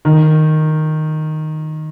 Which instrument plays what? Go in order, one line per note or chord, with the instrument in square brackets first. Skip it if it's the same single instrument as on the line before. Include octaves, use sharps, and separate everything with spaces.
[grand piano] D#3